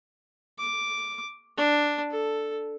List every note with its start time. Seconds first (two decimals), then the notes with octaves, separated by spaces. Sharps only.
0.59 D6
1.57 D4
2.12 A4